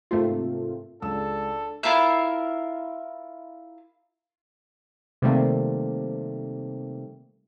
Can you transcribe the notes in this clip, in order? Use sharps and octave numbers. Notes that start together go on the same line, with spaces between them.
G#2 C3 A3 A#3 C4 F4
C#2 D4 A4 E6
E4 F4 A#4 E5
C3 D#3 G3 A3 A#3 C4